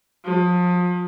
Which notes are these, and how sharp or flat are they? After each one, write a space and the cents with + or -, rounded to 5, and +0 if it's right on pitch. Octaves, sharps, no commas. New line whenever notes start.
F3 +30